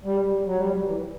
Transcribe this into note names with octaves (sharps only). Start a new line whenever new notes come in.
G3
F#3
G3
F#3
E3